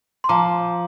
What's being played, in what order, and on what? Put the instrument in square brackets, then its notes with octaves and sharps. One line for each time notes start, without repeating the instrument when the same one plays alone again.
[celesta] C6
[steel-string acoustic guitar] F3 [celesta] A#5 D6